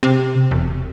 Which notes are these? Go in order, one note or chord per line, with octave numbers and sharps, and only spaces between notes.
C3
E1